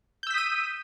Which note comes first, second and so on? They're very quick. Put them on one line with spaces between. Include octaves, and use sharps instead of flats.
G6 E6 B6 D#6 D#7